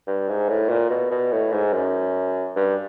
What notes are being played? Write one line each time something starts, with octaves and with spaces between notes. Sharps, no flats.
G2
G#2
A2
A#2
B2
B2
A2
G#2
F#2
G2